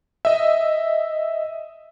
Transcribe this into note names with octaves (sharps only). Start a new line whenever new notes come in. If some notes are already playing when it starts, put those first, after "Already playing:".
D#5 E5